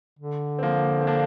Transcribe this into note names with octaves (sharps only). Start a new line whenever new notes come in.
D3
C4
F3 A#3
C4
A#3 D4